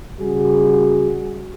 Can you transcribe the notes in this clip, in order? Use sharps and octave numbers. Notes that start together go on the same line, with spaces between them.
C#3 G3 F#4 G#4